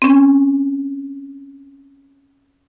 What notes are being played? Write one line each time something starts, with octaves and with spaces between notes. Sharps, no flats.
C4 C#4